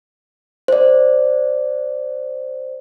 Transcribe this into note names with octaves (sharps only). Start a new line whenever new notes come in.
C5 D5